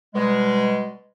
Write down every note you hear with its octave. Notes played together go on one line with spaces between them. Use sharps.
B2 G3 G#3